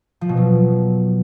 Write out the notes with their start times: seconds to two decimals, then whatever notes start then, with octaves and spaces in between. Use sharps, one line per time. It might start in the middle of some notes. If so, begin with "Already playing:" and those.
0.21 F3
0.29 B2
0.37 F#3